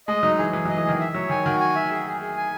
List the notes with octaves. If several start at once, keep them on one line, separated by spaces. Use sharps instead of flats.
G#3 D#5
F#3 D#4
E3 G#4
E3 G#4
F#3 D#5
E3
D#3 G#4
E5
F#3 C#5
D#3 G#5
D#3 F#4
G#5
E5
G#4
G#4
G#4
G#5